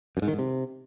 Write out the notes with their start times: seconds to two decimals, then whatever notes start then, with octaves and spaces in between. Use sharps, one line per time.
0.17 F#2
0.22 G#2
0.28 D#3
0.33 G#2
0.39 C3